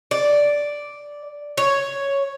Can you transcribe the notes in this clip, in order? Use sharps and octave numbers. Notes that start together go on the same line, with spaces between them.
D5
C#5